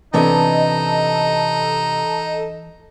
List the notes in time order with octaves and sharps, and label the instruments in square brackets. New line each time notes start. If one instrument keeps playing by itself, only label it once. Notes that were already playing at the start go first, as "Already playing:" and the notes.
[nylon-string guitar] C3 B3 D4 [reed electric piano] E3 [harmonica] D#4 [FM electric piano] A4 D#5 A5